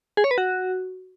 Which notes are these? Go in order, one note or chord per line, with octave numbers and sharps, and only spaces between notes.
G#4
C#5
B4
F#4